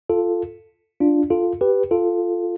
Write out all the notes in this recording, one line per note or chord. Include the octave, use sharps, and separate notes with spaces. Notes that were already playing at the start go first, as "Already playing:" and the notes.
F4 A4
D4 F4
F4 A4
G4 B4
F4 A4